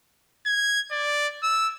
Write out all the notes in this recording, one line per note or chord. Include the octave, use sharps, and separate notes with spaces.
G#6
D5
E6